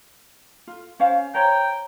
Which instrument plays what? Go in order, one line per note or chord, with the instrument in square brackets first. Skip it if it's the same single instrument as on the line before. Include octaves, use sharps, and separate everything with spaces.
[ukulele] F4
C#4 C5 F5
[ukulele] C5 C#5 A#5 [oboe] G5